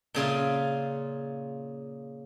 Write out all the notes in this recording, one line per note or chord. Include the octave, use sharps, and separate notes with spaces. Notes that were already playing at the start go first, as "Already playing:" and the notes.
A#2 C#3 F4 E5